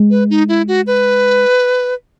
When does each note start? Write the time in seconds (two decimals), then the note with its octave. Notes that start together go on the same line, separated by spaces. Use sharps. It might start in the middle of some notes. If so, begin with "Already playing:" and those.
Already playing: G#3
0.10 B4
0.30 D#4
0.49 E4
0.68 F#4
0.87 B4